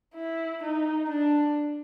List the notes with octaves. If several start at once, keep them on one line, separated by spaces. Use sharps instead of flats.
E4
D#4
D4